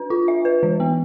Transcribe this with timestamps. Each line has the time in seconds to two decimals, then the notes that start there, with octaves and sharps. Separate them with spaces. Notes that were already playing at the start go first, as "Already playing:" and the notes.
Already playing: D4 B4
0.10 F4
0.28 E5
0.45 B4
0.63 E3
0.80 B3